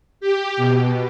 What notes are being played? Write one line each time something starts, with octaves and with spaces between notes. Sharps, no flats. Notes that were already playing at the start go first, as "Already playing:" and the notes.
G4
B2